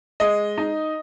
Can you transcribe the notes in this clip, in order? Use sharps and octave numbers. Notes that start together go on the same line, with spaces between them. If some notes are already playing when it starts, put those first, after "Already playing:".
G#3 D#5
D#4